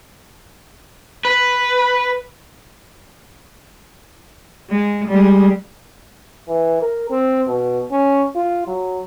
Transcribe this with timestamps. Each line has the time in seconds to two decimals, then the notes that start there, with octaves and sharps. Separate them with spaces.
1.25 B4
4.70 G#3
5.08 G3 G#3
6.48 E3
6.82 A#4
7.11 C4
7.48 B2
7.92 C#4
8.36 F4
8.67 F#3